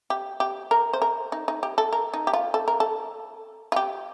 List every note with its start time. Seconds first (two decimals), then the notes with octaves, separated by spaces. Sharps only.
0.10 G4
0.40 G4
0.71 A#4
0.93 C5
1.02 A#4
1.32 D#4
1.48 D#4
1.63 G4
1.78 A4
1.93 A#4
2.14 D#4
2.27 G4
2.33 F4
2.54 A4
2.68 A#4
2.80 A4
3.72 F4
3.76 G4